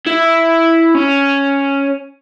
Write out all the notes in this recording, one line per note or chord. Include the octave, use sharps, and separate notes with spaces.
E4
C#4